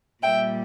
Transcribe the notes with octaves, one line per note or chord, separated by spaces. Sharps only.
A#2 G3 E5 G5